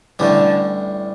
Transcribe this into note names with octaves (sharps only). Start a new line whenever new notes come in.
A1 A2 D3 G3